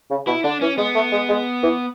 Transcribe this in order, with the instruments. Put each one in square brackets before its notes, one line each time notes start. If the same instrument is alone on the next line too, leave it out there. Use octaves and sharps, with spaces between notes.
[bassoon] C#3
[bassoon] B2 [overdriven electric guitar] E4
[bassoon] D3 [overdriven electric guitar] D4
[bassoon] E3 [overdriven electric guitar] C#4
[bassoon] G#3 [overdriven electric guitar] B3
[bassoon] A3
G#3
G#3
E3